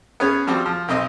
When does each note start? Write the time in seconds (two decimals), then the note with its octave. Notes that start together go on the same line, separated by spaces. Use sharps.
0.20 B3 C#4 G#4
0.47 F3 G3 C4 F#4
0.66 F3
0.88 B1 C4 D#5